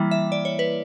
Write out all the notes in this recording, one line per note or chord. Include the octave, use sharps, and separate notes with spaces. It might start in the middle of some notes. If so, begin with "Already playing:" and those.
Already playing: E3 G3 A#3 E4
E5
D5
C#5
B4